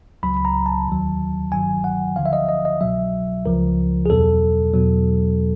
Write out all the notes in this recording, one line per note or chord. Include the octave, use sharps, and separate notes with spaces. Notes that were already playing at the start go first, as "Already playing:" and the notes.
C#2 C#3 F#3 B5
B5
A#5
A5
D#2 D#3 F#3
G1 G2 D#3 F#3 G#5
F#5
D2 D3 F3 F5
E5
D#5
D#5
D#5
C2 B2 F#3 E5
C#2 C#3 F3 A#4
G#4
E2 B2 F#3 A4
E2 B2 F#3